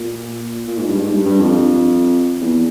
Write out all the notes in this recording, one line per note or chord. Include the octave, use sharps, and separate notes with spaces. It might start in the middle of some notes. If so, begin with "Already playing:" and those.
Already playing: A#2
A#2
G#2
G2
G#2
G2
G2
F2
E2